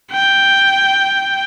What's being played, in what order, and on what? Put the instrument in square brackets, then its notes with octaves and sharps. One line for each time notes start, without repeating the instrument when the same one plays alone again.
[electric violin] G5